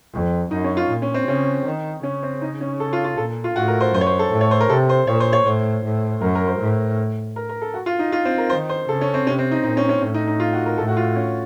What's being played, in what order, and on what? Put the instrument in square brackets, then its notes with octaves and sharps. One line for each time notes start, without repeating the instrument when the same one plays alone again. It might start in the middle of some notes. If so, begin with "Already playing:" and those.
[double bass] F2
[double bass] F#2 [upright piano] D#4
[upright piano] C#4
F4
[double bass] A#2
[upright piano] C#4
C4
[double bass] C#3 [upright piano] C#4
[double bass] D#3
[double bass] C#3 [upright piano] C#4
[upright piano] C4
D#4
C#4
A4
F4
F4
[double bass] A#2 [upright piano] A4
[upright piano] F4
[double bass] A2 [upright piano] F#4
[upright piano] A#4
C5
[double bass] F#2 [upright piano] C5
[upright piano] C#5
C5
A4
[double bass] A2
[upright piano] C#5
C5
A#4
[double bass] C3 [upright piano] A4
[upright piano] C5
[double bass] A#2 [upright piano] C#5
[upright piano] C5
C#5
[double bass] A2 [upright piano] C5
[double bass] A2
[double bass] F#2 [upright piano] A#4
[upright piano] A#4
C5
[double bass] A2
[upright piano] A#4
A#4
A4
F#4
F4
D#4
F4
C4
A#4
[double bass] D#3 [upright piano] C5
[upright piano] C5
[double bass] C#3 [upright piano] A4
[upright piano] C#4
C4
[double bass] C3 [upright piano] C#4
[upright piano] C4
D#4
[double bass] A#2 [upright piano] D#4
[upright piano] C#4
C#4
[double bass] A2 [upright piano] C#4
[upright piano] D#4
D#4
F4
F#4
A#4
[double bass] A2 [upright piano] A4
[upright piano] F#4
F4
C#4